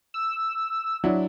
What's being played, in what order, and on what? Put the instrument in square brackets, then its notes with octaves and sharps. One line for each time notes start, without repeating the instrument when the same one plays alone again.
[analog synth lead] E6
[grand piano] F#3 D4 E4